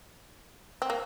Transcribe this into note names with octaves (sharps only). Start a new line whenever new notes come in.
C4
A#3